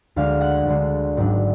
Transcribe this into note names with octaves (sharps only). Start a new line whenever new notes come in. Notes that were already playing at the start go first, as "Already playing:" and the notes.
D2 D3 G#3 F5
F#5
D2 D3 G#3
G#1 G#2 F#3 D4